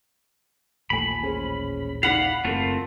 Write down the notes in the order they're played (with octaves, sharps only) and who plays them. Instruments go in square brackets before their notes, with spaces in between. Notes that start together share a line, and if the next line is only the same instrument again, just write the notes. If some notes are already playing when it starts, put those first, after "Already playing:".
[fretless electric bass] D#1 A1 A#2 [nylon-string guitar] A3 G#5 [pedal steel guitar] B5
[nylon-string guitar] C#4 G#4 C5
[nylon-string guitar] D#4 D5 [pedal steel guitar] F5 B5 [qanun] F#5
[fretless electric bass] F#1 [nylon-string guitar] E2 A#4 [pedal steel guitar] A3 C4 F4